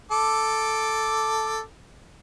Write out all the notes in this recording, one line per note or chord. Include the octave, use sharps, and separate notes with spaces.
A4 D6